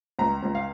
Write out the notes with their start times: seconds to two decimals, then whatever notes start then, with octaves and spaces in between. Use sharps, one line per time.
0.19 C#2 A#5
0.43 C#2
0.55 F5